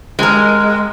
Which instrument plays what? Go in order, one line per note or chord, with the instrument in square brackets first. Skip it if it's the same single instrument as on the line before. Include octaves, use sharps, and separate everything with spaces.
[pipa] C3 A#4 [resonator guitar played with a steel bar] G#3